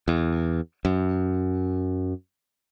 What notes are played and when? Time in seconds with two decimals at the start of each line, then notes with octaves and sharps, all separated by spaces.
0.08 E2
0.85 F#2